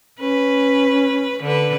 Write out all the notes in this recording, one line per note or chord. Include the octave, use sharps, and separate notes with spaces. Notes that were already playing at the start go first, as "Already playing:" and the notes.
C#4 B4
D3 B4